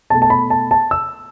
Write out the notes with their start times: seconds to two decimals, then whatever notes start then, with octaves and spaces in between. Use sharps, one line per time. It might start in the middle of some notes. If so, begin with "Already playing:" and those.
0.10 B2 A3 A5
0.22 A5
0.30 B5
0.50 A5
0.71 A5
0.91 E6